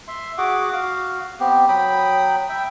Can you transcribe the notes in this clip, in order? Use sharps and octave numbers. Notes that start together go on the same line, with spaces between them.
E5 C6
F#4 G#4 F#5 D6
F#4 F5
B3 C4 G4
F#3 G5 B5 D#6
E5 G5